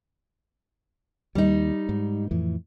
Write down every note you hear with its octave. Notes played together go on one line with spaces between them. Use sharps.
D#2 G3 D#4
G#2
F2 A2 E3